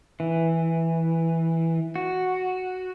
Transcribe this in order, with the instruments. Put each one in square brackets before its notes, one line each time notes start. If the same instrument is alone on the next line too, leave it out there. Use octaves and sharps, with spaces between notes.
[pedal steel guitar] E3
F#4